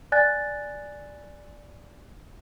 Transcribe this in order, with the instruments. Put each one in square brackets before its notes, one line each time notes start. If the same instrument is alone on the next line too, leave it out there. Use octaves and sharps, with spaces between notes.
[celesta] D5 G#5 F#6 A6